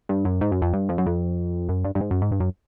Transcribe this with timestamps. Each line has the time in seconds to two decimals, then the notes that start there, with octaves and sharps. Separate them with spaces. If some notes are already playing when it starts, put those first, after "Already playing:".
0.09 G2
0.25 F#2
0.41 G#2
0.52 F#2
0.62 F2
0.73 G2
0.89 F2
0.98 F#2
1.06 F2
1.69 F#2
1.84 G2
1.95 G2
2.01 G#2
2.11 F#2
2.22 G#2
2.31 G2
2.40 F#2